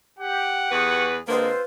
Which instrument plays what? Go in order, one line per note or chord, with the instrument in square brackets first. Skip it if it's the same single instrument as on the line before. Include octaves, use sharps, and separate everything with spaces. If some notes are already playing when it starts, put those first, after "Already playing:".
[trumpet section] G4 G5 [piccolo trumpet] F#5
[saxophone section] E2 G#4 B4 [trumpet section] G4 C#6
[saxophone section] D3 G#3 A#3 [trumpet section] C4 F4 C5 [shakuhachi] B4